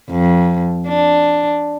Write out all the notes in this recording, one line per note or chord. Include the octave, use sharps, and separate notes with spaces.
F2
D4